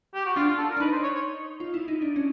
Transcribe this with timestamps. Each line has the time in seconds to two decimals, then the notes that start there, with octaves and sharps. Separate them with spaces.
0.14 G4
0.26 F#4
0.36 D4 F4
0.47 F4
0.58 A4
0.70 A#4
0.77 D4
0.80 D#4 B4
0.92 C5
1.03 C#5
1.15 C#5
1.60 F4
1.74 E4
1.88 D#4
2.02 D4
2.16 C#4